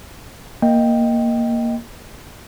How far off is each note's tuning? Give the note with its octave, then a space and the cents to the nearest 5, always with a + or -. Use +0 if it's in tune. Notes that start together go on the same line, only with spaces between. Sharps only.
A#3 +0 D#5 +0 G5 +0